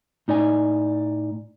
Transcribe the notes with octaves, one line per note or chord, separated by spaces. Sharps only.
A2 D#4 D5 G#5